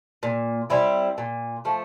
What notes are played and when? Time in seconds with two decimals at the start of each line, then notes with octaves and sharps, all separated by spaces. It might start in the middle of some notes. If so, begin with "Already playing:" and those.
0.23 A#2
0.70 G3 C4 E4
1.18 A#2
1.65 F3 A3